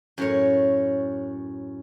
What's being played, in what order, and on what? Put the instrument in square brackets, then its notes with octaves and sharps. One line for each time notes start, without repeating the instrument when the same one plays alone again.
[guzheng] F#2 A2 C#5